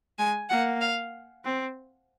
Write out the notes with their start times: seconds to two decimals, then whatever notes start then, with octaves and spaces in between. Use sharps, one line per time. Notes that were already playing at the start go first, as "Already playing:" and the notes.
0.18 G#3 G#5
0.49 A#3 F#5
0.81 F5
1.45 C4